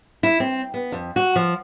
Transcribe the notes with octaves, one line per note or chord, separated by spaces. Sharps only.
E4
C4
B3
F2
F#4
F3